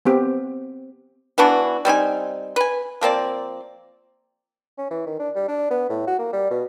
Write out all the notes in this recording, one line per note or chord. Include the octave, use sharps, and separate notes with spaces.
B3 C4 G4
E3 B3 D4 F#4
G3 C4 D#4 G#5
B4 G#5
F3 A#3 C4 D5
C#4
E3
D#3
D4
G3
D4
B3
A2
F#4
A#3
G3
B2